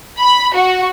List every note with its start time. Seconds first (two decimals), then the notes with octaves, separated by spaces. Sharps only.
0.19 B5
0.55 F#4